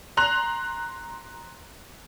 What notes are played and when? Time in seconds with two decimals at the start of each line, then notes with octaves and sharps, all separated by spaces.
0.17 A#5 C6 F#6 F7